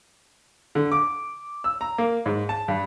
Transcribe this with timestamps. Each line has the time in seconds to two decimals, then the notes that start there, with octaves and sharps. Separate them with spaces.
0.75 D3
0.92 D6
1.64 E6
1.81 A#5
1.98 A#3
2.26 G#2
2.49 A5
2.68 G2